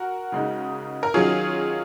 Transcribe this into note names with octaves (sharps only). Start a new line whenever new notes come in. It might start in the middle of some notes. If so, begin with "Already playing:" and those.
Already playing: F#4 A#4
C#3 G#3 D#4
A#4
D#3 F#3 C#4 F4 G#4